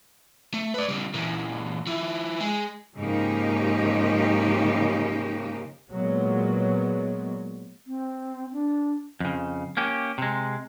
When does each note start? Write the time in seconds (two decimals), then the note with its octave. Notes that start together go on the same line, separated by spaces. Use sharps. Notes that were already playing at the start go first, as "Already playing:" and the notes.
0.54 A3
0.74 B4 D5
0.88 C#3 G3
1.14 A#2 E3
1.87 F3 E4
2.41 G#3 G#4
2.96 G#2 C#3 F3 A#3 D#4 G4
5.91 A#2 F#3 G#3 B3
7.86 C4
8.53 D4
9.20 F2 C#3
9.77 A#3 C#4 G4
10.18 C3 G#3